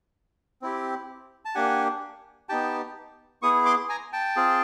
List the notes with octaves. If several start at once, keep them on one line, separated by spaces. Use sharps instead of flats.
C4 E4 G4
A5
A#3 D4 G4 F#5 G#5
B3 D#4 G4 G5 A5
B3 E4 G#4 C#6 D#6
C6 D6
G#5 A#5
G5 A5
C4 F4 G#4